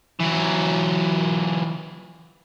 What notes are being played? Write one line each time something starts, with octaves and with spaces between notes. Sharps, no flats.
E3 F#3